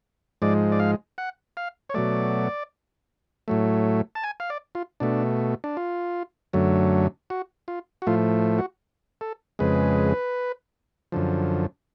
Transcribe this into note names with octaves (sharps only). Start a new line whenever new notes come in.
G#2 F3 G#3 D5
D5
F5
F#5
F5
C#5
B2 F#3 A3 D5
A2 F#3 A3
A5
G#5
F5
D5
F4
B2 A3 D4
D4
F4
F#2 D3 F#3 A3
F#4
F4
F#4
A2 F3 A3 F4
F#4
A4
F2 C#3 G#3 B4
F#2 D3 F3